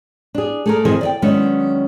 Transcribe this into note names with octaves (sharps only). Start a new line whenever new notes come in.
D4 G#4
A3 G#4 A#4
D#3 E3 C4 G#4 C5 D#5
D5 D#5 G5
D#3 F#3 G#3 B3 C#4 D4